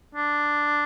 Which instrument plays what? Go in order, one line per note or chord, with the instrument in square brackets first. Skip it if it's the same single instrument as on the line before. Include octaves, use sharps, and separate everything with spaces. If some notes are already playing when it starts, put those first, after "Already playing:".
[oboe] D4